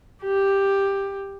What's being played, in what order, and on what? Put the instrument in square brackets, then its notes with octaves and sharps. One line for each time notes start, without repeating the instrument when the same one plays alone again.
[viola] G4